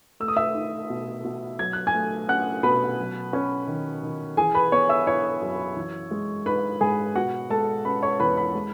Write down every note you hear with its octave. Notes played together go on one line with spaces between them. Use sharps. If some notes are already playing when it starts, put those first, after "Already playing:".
A3 E6
D#6
E5 E6
D#4
B2
B2
F#3 G#6
F#6
G#5 G#6
A3
C#4 F#5 F#6
B2 B4 B5
F#3
C#4
D#3
D#3
E3 G#4 G#5
B4 B5
B3 C#5 C#6
E5 E6
E4 C#5 C#6
F#2
E3
G#3
D#4 B4 B5
G#2 G#4 G#5
B2 F#4 F#5
G#3 A4 A5
C#4 B4 B5
C#5 C#6
E2 B4 B5
B4 B5
G#3